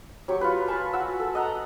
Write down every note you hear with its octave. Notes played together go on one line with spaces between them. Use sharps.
F#3 G4 C#6
F4 B4
G#5 A5 B5 C#6
F#4 F#5 E6
A4
D#5 F#5 A#5